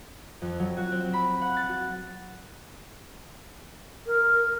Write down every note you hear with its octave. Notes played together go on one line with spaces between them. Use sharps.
F2
F#3
F#4
C4
B5
F#5
A6
F#4
A#4